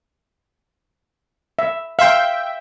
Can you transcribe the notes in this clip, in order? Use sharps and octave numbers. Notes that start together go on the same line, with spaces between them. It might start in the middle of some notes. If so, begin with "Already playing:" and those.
E5
E5 F5 G5 C6